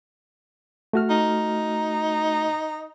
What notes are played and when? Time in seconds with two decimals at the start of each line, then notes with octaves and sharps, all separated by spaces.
0.93 A3 F#4 F6
1.10 D#4